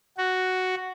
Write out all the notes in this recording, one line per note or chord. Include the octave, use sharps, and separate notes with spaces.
F#4